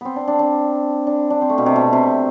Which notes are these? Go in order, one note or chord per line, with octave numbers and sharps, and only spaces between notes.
B3 C4
D4
D4
D4
D4
D4
C4
A3
B2
C3
B2
C3